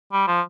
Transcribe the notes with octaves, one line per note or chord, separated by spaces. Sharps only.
G3
F3